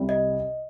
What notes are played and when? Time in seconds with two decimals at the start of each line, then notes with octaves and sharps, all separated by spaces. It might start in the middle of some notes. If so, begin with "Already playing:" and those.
Already playing: C2 C3 G3
0.09 D#5